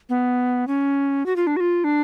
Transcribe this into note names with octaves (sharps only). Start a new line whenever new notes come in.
B3
C#4
F#4
F4
D4
F#4
F4
D4